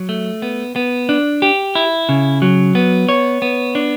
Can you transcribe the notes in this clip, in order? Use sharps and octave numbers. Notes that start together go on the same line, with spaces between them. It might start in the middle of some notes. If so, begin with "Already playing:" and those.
Already playing: F#3
A3
B3
B3
D4
G4
E4
C#3
F#3
B3
C#5
B3
D4